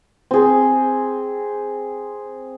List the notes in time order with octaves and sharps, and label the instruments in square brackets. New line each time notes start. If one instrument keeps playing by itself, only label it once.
[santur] C4 G#4